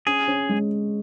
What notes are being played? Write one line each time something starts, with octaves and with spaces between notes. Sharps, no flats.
C#4 G#4
C#4
G#3